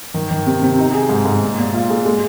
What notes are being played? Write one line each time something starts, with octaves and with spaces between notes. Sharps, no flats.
D#3
D#3
C3
C3
D#4
G#4
G#2
G#2
A#2
A#2
F4
G#3
G#3